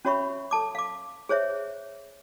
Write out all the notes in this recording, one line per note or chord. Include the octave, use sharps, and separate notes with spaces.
C#4 F#4 C#5 E5 B5 C#6
A4 A5 D6
F5 D6
G#4 C5 C#5 E5